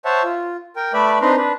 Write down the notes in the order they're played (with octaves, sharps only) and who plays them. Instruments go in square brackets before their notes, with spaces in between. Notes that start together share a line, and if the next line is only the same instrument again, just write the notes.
[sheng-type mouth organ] C5 C#5 E5 F#5 A5
F4
A#4 G5
A3 B4 D5 E5 B5
C4 D4 D#4 B4 A#5 C6
D4 B4